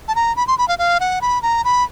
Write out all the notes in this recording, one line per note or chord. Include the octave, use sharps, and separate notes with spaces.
A5
A#5
B5
C6
B5
F5
F5
F#5
B5
A#5
B5